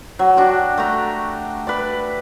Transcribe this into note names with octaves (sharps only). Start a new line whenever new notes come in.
F#3
D4 F#4 G4
A3 A#5
B4 D5